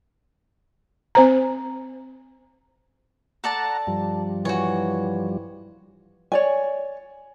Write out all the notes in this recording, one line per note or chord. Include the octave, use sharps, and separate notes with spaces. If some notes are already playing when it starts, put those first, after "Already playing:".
C4 C5 A#5
A4 D5 F#5 A5 A#5
G2 F3 G3
E3 F#4 C#5
C#5 D5 G#5